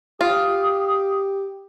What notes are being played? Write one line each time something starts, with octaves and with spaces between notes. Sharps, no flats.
F4 G4 D#6